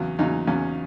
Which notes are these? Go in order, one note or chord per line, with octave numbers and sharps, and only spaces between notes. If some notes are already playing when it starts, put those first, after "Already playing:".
Already playing: E2 C#3 F#3
E2 C#3 F#3 D#4
E2 C#3 F#3 C#4